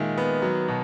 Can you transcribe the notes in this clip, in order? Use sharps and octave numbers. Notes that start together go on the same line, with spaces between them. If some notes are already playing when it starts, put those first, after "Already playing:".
Already playing: A#2 D#3 G#3 E5
B3
F#3
B2